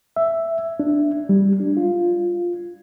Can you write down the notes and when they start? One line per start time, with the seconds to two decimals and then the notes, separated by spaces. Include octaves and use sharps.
0.16 E5
0.80 D4
1.29 G3
1.60 D4
1.77 F4